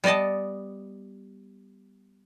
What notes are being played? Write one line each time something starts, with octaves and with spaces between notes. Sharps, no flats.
G3 B3 D5 D#5 A5